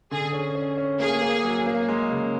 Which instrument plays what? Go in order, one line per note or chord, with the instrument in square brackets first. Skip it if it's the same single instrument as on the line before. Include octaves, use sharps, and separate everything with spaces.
[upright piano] D3 [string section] G#4
[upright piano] C#4
C#4
C#4
[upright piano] A#3 [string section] G#4
[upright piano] A#3
F#3
A#3
G#3
C#3